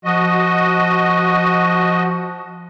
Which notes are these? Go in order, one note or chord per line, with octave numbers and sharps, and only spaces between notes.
F3 F#4 D#5